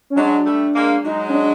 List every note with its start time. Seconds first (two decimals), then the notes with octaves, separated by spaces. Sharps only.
0.10 C#4
0.16 F#3 G#3 D4
0.45 G3 A3
0.75 G#3 A#3
1.05 F#3 G#3 D#4
1.29 C#4
1.34 D4